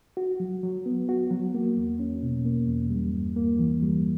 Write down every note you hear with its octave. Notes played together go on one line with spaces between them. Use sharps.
F#4
F#3
F#3
B3
F#4
F#3
A#3
E2
C#4
B2
A#3
E2
G3
G2
A#3
E3
G3